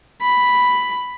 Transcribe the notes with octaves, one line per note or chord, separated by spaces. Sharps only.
B5